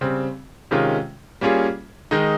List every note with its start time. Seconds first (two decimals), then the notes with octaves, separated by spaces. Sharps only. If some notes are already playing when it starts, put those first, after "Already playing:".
0.01 C#3 G3 C4
0.71 C3 D#3 G#3 C#4 F4
1.41 G3 A#3 C#4 F4 G#4
2.11 D#3 G#3 D#4